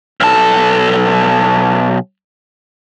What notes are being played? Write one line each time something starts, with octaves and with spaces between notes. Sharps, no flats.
B1 A4